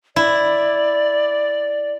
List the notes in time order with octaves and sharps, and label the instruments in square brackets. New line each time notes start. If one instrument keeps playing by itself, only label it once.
[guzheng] E4 [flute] D5